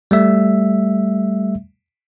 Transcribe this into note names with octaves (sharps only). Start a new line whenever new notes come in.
G3 A3 E5